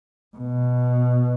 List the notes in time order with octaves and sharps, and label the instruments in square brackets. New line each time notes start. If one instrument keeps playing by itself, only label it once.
[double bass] B2